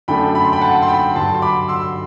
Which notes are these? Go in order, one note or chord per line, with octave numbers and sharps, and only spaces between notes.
F#2 D3 A3 D4 G5 B5
B5
C6
G5 B5
F#5 A5
C6
G5 B5
G2 D3 F#3 A5 C6
C6
B5 D6
C6 E6